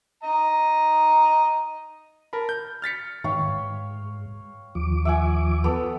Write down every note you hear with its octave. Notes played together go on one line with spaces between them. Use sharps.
D#5 A#5
A#4 A5 B5
G6
F6 A6 B6 C#7
G#2 D#3 C#5 F5 G5
G#2
D#2 F3 D6
E5 F#5 G#5
B3 A4